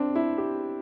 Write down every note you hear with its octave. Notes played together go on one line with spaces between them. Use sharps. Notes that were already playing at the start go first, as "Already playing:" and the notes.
Already playing: C4 D4
E4
G4